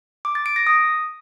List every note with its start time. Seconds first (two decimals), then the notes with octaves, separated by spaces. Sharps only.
0.25 D6
0.35 A6
0.46 D7
0.56 A#6
0.67 D#6